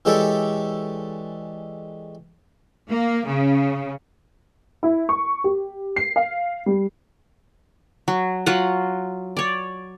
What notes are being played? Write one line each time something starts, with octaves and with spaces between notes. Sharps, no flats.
E3 G#3 G4 A4 C#5 D5
A#3
C#3
E4
C#6
G4
C7
F5
G3
F#3
F#3 F4 F#5
C#5 D5